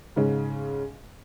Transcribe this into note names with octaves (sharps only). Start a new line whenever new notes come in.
G#2 C#3 C#4